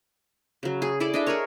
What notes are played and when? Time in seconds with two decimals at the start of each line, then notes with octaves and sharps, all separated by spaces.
0.63 C#3 F#3
0.82 G#4
1.00 E4 G#4 A4 D5
1.14 D4 D#5 E5
1.27 G#4 A#4 C#5